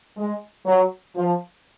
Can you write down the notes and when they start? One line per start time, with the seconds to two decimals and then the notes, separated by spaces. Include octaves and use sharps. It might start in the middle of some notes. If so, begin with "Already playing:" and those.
0.17 G#3
0.66 F#3
1.16 F3